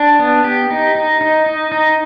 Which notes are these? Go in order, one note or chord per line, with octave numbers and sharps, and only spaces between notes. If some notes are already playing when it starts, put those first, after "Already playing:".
Already playing: D4
B3
G4
D#4
D#4
D#4
D#4
D#4